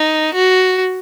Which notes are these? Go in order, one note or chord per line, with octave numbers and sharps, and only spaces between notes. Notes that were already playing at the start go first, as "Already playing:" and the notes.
Already playing: D#4
F#4